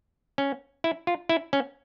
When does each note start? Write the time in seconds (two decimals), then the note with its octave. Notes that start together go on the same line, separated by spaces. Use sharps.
0.38 C#4
0.84 E4
1.07 F4
1.29 E4
1.53 C#4